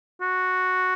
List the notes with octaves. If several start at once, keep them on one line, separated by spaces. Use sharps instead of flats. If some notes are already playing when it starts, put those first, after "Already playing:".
F#4